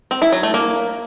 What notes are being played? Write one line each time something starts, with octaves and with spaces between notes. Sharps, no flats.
C4
E4
F#3
A3
A#3